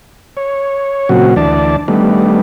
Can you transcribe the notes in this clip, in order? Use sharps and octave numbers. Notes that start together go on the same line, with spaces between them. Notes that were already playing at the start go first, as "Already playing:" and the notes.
C#5
A#2 C#3 F#3 C4 F#4
D2 E3 D4 D5 A5
D#3 G3 A3 B3 D4